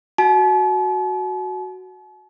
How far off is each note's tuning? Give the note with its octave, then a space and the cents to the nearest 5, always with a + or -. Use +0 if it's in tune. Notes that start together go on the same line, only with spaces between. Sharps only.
F#4 +0 A5 -45